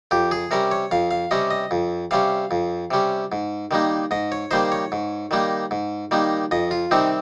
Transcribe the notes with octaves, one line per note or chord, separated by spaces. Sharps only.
F2 G4
G#4
C3 G3 C#4 A#4
C#5
F2 F5
F5
C3 G3 C#4 D#5
D#5
F2
C3 G3 C#4 F5
F2
C3 G3 C#4
G#2
D#3 G3 A#3 D#4
G#2 D#5
C#5
D#3 G3 A#3 D#4 C5
C#5
G#2
D#3 G3 A#3 D#4
G#2
D#3 G3 A#3 D#4
F2 D#5
F4
C3 D#3 G3 C4 D#4